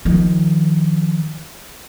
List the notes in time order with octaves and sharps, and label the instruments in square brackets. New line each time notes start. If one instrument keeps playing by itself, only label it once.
[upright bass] D#3 F3